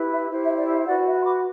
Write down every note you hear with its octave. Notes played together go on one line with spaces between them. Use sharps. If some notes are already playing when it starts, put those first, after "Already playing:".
Already playing: E4 G4 B4
E5
E4 G4 C5
E5
D5
E5
F#4 B4 D5 F#5
E5
C6
B5 D6